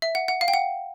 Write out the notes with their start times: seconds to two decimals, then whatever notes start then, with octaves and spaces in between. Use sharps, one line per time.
0.02 E5
0.15 F#5
0.28 F#5
0.41 F5
0.48 G5
0.54 F#5